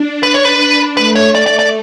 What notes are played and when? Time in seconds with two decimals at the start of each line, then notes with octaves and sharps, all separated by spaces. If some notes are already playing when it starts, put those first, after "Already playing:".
Already playing: D4
0.23 B4
0.34 C#5
0.45 B4
0.97 A3 B4
1.15 C#5
1.35 D5
1.46 D5
1.59 D5